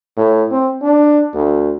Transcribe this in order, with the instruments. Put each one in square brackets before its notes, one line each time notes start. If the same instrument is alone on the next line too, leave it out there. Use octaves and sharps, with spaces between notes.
[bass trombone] A2
C4
D4
D2